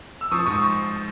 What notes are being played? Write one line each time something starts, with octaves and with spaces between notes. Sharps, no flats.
E6
F3 C#6 D#6
G#2 C#6 D#6